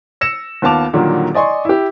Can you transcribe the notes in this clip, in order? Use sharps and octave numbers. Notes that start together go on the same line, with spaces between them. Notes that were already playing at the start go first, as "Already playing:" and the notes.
E6 A#6 C#7 E7
D#2 B3 F4 A5 D6 F7
A#2 D3 D#3 F#3 G3 A#3
D5 D#5 G#5 C6 C#6
E4 G4